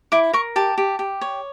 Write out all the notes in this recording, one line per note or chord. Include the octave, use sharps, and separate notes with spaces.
E4 D6
A#4 C#6
G4 A5
G4
G4
C#5